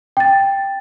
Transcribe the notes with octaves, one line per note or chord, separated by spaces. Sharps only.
G5 A6